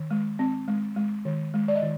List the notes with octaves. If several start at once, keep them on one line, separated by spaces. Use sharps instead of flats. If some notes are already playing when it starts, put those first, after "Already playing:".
Already playing: D#3
G#3
C4
G#3
G#3
D#3
G#3
D5
D#5
D#3